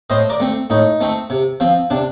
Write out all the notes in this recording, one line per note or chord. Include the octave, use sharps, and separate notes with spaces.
A2 C5 D#5
A#4 D5
A3 C4
A2 D#4
A3 C4
C3
F3 C4
C3 D4